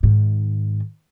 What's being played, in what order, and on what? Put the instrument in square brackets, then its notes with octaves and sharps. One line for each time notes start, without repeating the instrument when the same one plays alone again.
[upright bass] G#2 D#3